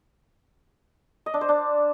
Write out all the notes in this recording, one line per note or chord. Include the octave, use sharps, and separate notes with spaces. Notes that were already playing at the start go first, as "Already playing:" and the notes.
D#5
D4
C5
D4